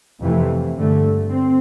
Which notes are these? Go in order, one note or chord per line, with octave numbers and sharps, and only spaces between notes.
F2 C3 E3 A3
G2 D3 A3
C4